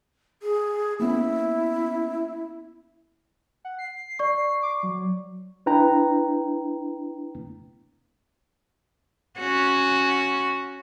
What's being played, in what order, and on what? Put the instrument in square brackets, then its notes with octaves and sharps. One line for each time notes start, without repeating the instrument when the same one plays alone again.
[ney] G#4
[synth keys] A#3 B3 C#4 [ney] E4
[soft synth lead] F#5
C7
[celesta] D5 C#6
[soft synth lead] D6
F#3
[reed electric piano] D4 E4 B4 G5 A#5
[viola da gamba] C#4 F#4